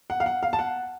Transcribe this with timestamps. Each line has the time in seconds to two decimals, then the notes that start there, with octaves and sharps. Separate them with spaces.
0.10 F#5
0.20 F5
0.26 F#5
0.43 F5
0.53 A5
0.59 F#5